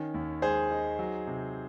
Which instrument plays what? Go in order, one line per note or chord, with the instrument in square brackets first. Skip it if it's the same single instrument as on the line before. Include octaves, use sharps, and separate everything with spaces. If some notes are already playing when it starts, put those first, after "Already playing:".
Already playing: [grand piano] D#3 C#4
D#2
G#3 G#4 C5
D#4
F#3
C3